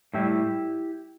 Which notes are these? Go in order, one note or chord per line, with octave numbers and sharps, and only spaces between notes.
A2 G3 E4 G4